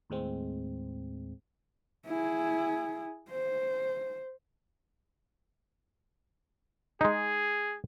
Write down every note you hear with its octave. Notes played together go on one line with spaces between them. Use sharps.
D#2 A2 G#3 C4
E4 G#4
C5
G#3 D#4 G#4